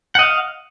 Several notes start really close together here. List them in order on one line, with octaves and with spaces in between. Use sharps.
F#5 D#5 F5